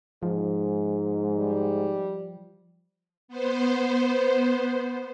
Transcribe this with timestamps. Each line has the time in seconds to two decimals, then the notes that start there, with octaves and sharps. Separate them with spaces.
0.23 G#2 F3
1.38 G3
3.28 B3 C5